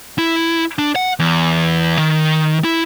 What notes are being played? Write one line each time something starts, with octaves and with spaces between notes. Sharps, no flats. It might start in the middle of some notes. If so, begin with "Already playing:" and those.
E4
D4
F#5
E2
D#3
E4